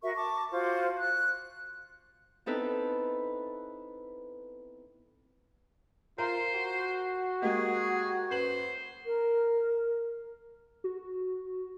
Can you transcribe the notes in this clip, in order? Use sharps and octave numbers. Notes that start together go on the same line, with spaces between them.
F#4 A#4 E5 C#6
A5 C#6 D6
F4 F#4 C5
F#6
B3 C4 D#4 E4 A4 B4
F4 A#4 C5
F#4
G#3 A#3 G4 G#4
F#2 B4 C5 F#7
A#4
F#4